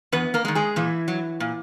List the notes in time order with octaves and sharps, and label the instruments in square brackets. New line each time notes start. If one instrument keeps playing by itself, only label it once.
[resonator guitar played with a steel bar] E2 B3 B4
A#3 A#4
G#3
D#3
G#3 G#4
A#2 E3 E4
F#3
A#2